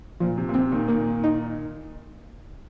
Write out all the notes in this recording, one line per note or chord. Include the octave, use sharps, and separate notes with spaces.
A#2 F3
C3
A#2
C3 C4
A#2 D#3
A#2 D#3 A#3
D#4